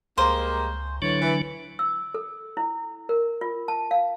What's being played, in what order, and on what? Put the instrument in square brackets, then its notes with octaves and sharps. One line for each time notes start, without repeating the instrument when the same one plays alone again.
[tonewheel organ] C#2 [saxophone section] G3 G#3 A#3 [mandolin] C5
[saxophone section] A2 E3 C#5 [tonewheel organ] D3 F#3 D4
[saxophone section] E3
[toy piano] E6
A4
E4
A#4
F4
A5
F5